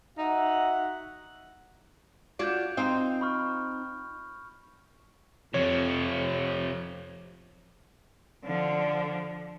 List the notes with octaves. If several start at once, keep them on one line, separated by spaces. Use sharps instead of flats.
D#4 F#4 E5 F#5
D4 F4 F#4 G6 G#6 D7
C4 D#4 F4
B5 C#6 F6
F2 C3 F3 C#5
D3 F3